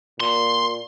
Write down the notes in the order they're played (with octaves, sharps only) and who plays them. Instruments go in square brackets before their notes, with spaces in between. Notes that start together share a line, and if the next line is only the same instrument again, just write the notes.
[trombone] A#2 [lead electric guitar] C6